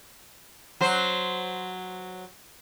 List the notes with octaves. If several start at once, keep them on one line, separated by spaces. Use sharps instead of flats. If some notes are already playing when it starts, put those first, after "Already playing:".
F#3 C5